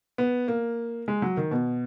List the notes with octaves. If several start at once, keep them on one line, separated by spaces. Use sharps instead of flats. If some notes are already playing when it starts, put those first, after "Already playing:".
B3
A#3
G#3
F#3
D#3
B2